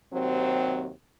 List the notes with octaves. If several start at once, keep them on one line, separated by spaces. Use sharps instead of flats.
D#2 C3 F#3 C4